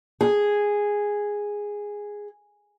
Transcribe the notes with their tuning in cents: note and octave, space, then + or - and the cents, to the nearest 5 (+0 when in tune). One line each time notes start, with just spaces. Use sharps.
G#4 -5